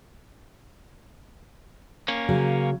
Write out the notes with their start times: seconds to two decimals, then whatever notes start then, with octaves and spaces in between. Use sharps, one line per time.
2.08 A#3 C#4
2.29 C#3 F#3 G#4